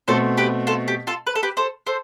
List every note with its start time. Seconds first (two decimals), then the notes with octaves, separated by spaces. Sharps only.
0.08 B2 A3 C4 A4 C5
0.37 G4 B4
0.67 F4 A4
0.88 G4
1.07 F4 A4
1.27 B4
1.35 A4
1.43 G4 B4
1.57 A4 C5
1.87 A4 C5